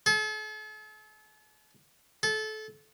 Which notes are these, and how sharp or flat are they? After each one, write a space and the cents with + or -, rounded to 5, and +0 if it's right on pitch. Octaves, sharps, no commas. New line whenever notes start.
A4 -45
A4 -25